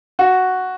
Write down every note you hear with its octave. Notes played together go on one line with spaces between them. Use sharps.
F#4